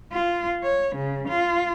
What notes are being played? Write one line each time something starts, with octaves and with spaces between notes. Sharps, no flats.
F4
C#5
C#3
F4